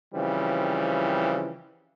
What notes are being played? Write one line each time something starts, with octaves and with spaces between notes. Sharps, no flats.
C#3 E3 F3 G3 C4